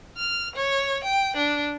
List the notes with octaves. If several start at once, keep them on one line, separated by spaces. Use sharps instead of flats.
F6
C#5
G5
D4